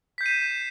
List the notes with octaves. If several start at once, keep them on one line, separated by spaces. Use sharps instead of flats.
G6 B6 C7 D#7 E7